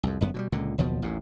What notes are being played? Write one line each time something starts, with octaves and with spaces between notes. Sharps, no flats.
C2 F2
G1 F#2 B3
B2 F#3 G3
C#2 A#2 D3
F#1 D#2 B2 F3
A1 D#2 A2